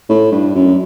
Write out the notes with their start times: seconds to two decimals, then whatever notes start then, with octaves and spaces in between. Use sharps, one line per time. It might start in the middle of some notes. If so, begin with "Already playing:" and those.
0.09 A2
0.32 G2
0.55 F#2